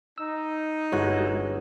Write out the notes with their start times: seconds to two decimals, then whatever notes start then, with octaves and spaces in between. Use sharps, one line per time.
0.18 D#4 E6
0.92 G1 G#3 E4 F#4 G#4 C#5 F#5 F#6